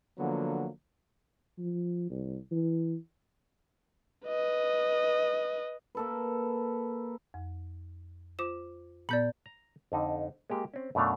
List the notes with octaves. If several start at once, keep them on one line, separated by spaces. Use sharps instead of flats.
D3 F3 F#3 A#3 B3
F3
C2
E3
B4 D#5
A#3 A4 B4
F2
F4 C5 D6 E7
A#2 B3 D5 G6 F#7
A#5
F2 D3 D#4
G#3 A#3 G4
C4 C#4
F#2 B2 A3 D4 F5